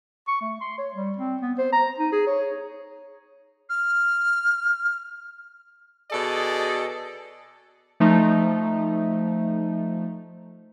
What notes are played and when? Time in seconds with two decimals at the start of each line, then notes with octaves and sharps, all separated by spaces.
0.28 C#6
0.41 A3
0.61 C6
0.78 C#5
0.94 G3
1.17 C4
1.41 B3
1.58 C5
1.73 A#5
1.99 D#4
2.12 G#4
2.27 C#5
3.69 F6
6.11 B2 G#4 A4 D5 D#5
8.00 F3 A3 D#4